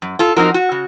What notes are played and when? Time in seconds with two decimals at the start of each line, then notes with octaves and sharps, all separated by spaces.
0.02 F#2
0.19 F4 A4
0.36 F3 C4 D#4 F#4 A#4
0.54 F#4
0.72 C#3